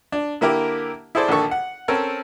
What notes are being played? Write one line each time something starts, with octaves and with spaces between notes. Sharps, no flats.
D4
D3 A#3 E4 G4 A#4
E4 G#4 A4 C5 D5
A#1 D3 D#3 A4 C#6
F#5
C4 C#4 A4 A#4